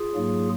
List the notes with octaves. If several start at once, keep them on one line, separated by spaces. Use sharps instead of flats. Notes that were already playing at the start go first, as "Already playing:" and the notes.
Already playing: F4 G#4
G#2 F#3 A#3